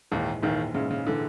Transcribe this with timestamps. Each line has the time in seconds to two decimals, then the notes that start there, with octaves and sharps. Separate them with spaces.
0.12 A#1 D#2 G#2 D#3 E3
0.43 A#1 D#2 G#2 D#3 E3
0.74 A#1 G#2 C#3 E3
0.91 C#3
1.07 D3 E3